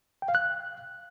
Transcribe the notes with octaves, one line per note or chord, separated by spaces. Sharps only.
G5
F5
F#6